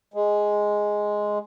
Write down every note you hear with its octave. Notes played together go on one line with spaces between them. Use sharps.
G#3